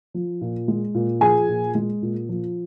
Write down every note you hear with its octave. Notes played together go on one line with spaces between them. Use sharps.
F3
A#2
G#3
A#2
F3 G#4 G#5
A#2
G#3
A#2
F3